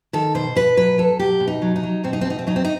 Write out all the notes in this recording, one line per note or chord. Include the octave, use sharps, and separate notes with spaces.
D#3 A4
B2 C5
B2 B4
F#3 B4
F#3 A4
B2 G4
B2
D#4
F#3
D#4
F#3
B2 C4
D#4
C4
B2
D#4
C4
F#3 D#4
C4
D#4